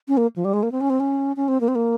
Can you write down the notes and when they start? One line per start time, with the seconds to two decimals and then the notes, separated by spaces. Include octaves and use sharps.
0.08 C#4
0.17 A#3
0.36 F3
0.45 G3
0.54 G#3
0.63 A#3
0.72 C4
0.81 C#4
0.90 C4
1.00 C#4
1.36 C#4
1.48 C4
1.61 A#3
1.68 C4
1.75 A#3